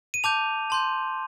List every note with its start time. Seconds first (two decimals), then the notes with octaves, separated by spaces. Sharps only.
0.14 D#7
0.24 A5 D6 G6 F7
0.70 A5 C6 G6